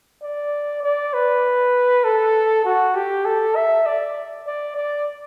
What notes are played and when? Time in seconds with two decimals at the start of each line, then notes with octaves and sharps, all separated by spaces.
0.23 D5
0.83 D5
1.13 B4
2.04 A4
2.65 F#4
2.95 G4
3.25 A4
3.56 E5
3.86 D5
4.47 D5
4.76 D5